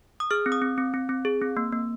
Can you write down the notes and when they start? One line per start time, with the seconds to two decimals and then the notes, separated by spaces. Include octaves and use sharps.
0.20 D#6
0.31 G#4 F6
0.46 C4
0.52 D#6
0.62 C4
0.78 C4
0.94 C4
1.09 C4
1.25 G#4
1.42 C4
1.57 A#3
1.72 A#3